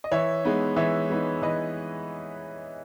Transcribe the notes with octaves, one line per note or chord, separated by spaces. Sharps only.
D#5
E3 C#5 E5
G#3 B3 D#4
E3 C#5 E5
G#3 B3 D#4
E3 B4 D#5